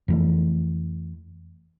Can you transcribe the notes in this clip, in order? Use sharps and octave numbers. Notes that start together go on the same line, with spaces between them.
F2 E3 A3